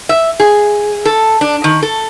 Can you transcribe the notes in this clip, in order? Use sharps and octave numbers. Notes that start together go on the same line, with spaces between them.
E5
G#4
A4
D4
D#3
A4